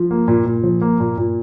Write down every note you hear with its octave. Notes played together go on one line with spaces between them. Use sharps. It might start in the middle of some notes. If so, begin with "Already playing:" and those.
Already playing: F3
A#3
A#2
A#2
F3
A#3
A#2
A#2